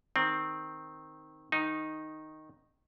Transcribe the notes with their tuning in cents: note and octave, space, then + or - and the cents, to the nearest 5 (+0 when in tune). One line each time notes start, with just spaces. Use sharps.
D#3 +0 C4 +0
D#3 +0 D#4 +0